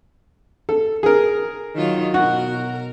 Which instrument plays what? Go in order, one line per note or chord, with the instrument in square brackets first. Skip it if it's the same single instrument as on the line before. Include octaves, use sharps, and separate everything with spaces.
[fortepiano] A4
G#4 A#4
[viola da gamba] D#3 F#3 F4
[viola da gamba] B2 A#4 [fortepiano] F#4